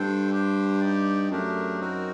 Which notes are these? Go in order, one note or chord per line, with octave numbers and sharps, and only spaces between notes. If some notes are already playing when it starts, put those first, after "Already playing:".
Already playing: G2 D4 A4 C5 G5
D4 G4 C5 G5
D#4 G4 D5
F#2 A3 D4 G4 A#4
C4 D#4 F#4 A#4